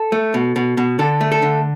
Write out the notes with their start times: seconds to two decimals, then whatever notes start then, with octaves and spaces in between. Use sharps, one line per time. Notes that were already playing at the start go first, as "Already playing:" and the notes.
Already playing: A4
0.12 A3
0.34 B2
0.56 B2
0.77 B2
0.99 D3 A4
1.21 A3
1.32 A4
1.42 D3